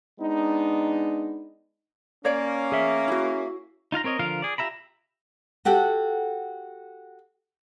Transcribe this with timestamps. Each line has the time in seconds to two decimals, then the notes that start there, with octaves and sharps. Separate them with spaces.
0.20 G#3 B3 D4 D#4
2.25 A#3 C#4 C#5 D5
2.72 G#4 E5
3.08 E4 F#4
3.92 D#4 F4 F5 A#5
4.04 C4 A#4 C#5 D#5
4.19 D3 F3 F4 A#4 F5
4.42 G#4 D5
4.58 F4 G4 E5 A#5 B5
5.65 F#4 G4 A4 F#5